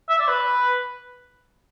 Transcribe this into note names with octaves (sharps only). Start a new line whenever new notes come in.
E5
D5
B4